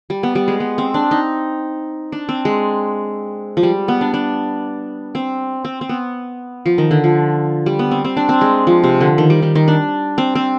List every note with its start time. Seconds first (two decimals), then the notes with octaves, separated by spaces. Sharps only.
0.10 G3
0.23 B3
0.35 G3
0.48 G#3
0.60 B3
0.78 C4
0.94 D4
1.11 D#4
2.12 D4
2.29 C4
2.45 G#3
3.57 F3
3.63 G3
3.88 B3
4.01 D4
4.14 D4
5.15 C4
5.65 C4
5.81 C4
5.89 B3
6.66 F3
6.78 D#3
6.91 D3
7.04 F3
7.66 G3
7.79 B3
7.91 C4
8.04 C4
8.17 D4
8.29 C4
8.41 G#3
8.67 F3
8.84 C3
9.00 D3
9.18 D#3
9.30 G3
9.42 D#3
9.55 D#3
9.68 D4
10.18 C4
10.35 C4